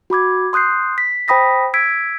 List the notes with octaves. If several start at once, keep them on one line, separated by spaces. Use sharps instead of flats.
F#4 B5 D6 G#6
C6 D#6 F#6 G6 C7
B6
C5 G5 B5 D#6 A#6 B6
E6 G#6 B6 D7